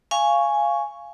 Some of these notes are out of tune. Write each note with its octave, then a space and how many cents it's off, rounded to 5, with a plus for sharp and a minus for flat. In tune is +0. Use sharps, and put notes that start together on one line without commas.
F5 -15 G#5 +0 C#6 +0